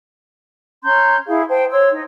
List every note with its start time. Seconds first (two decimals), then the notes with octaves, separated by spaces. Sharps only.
0.83 C#4 A#5 C6 G6
1.28 E4 G#4 F5
1.49 C5 G5 A5
1.71 C#5 C6 E6
1.91 D#4